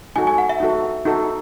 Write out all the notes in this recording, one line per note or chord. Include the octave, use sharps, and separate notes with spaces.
D#4 F#4 A4 G#5
G#5
F#5
E5
D#4 F#4 A4
D#4 F#4 A4